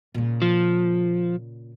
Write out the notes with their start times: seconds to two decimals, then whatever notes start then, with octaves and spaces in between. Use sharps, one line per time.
0.14 A#2 C#3
0.42 F3